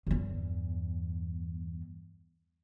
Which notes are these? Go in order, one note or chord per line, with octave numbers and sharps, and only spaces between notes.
E2 G2